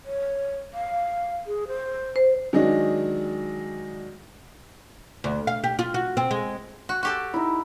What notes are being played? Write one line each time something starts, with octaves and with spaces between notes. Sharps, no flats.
C#5
F5
G#4
C5
C5
D#3 F#3 G#3 D4 F#4 D#5
D2
F5
G4
F4
F#4
C4
G#3
F#4
F#4 G4 A4
D#4 E4